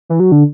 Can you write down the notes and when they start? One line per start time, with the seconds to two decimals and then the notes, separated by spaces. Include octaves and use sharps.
0.09 E3
0.20 F#3
0.32 D3